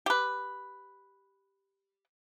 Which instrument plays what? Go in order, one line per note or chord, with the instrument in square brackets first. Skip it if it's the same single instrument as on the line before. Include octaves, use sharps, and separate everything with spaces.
[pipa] G4 B4